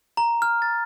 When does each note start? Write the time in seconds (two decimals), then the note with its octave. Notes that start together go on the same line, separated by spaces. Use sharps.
0.17 A#5
0.42 F6
0.62 A6